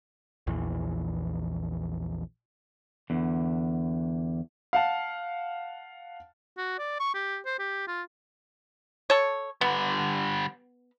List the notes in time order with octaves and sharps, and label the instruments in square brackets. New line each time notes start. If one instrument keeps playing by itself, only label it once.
[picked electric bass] A#1 E2 E3
[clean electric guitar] E2 D3
[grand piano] F5 F#5 A5
[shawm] F#4
D5
C#6
G4
C5
G4
F4
[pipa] A4 C#5
[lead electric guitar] D3 G3 [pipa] B3